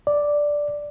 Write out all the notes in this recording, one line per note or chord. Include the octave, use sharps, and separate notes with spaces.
D5